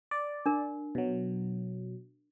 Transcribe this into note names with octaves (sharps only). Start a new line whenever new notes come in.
D5
D4 A#4
B2 F#3